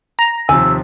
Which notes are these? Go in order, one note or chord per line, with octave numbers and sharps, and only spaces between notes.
A#5
D#2 C3 F3 G#5 E6